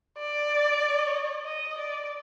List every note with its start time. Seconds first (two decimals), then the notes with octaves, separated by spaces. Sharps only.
0.18 D5
1.45 D#5
1.78 D5